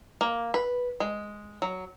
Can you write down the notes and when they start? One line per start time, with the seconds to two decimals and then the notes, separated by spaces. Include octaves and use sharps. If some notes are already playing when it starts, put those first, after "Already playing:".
0.21 A#3
0.54 B4
1.00 G#3
1.62 F#3